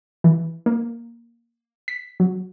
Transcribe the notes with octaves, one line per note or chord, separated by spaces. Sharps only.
E3
A#3
B6
F#3